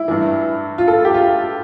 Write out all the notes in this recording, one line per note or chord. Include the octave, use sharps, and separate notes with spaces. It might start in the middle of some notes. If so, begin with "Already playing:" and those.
Already playing: E4
G2 E3
F4
A4
G4
F4